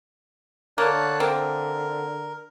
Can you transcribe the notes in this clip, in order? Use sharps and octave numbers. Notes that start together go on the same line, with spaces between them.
D3 A#3 C#5 A5 F#6
A#3 C4 A#4